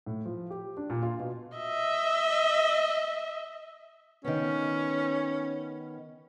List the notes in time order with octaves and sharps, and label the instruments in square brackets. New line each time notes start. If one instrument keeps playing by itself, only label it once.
[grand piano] A2
F3
G4
D4
A#2
F4
B2
[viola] D#5 E5
[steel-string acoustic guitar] D#3 B3 [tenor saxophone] C#4